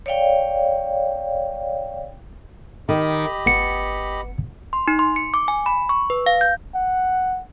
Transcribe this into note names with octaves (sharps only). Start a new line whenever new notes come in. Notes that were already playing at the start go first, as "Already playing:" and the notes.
C#5 D5 F5 G5
D#3 G4 D#5 B5
G1 B3 C#7
C6
D#4
C6
C#7
D6
G#5
B5
C#6
B4
F5
G6
F#5